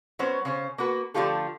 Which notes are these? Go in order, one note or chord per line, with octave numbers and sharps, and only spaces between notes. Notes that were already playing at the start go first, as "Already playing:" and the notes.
F#3 B3 C#4 C5
C#3 C#4 C5
A#3 B3 F#4 B4
D3 F3 A3 F4 G4 A4